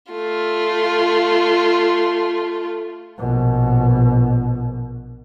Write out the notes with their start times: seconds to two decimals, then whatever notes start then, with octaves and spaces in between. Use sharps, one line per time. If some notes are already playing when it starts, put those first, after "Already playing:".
0.12 A3 F4
3.18 A#1 B2